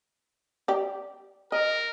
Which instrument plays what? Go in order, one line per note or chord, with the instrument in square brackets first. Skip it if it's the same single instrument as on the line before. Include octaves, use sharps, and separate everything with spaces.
[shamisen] G4 D5
[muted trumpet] A#4 [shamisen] D#5